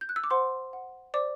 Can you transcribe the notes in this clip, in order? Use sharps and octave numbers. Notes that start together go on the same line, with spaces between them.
G6
F#6
E6
D6
C5 F#5 C6
F#5
C5 D5 D6